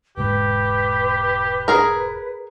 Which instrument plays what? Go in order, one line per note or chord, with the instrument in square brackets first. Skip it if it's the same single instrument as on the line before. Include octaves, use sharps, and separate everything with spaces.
[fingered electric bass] E1 G#2 G#3 [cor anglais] G4 [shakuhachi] B4
[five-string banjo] G#4 A#4